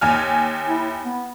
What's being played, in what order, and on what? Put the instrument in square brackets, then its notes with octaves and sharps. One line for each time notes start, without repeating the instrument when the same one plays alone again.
[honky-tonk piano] D#2 G#5 F6
[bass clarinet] E4
B3